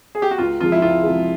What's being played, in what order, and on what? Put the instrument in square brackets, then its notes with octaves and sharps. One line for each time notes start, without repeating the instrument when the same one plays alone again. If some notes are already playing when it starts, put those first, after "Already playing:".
[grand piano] G#4
G4
F#4
[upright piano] C#2 [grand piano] F4
[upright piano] C3 F3 G#3 [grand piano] F4
[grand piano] E4
[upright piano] C#2 [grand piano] F4
[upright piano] C3 F3 G#3